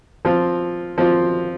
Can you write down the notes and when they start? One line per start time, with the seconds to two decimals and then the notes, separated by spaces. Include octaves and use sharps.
0.25 F3 C4 F4
0.98 F3 C4 F4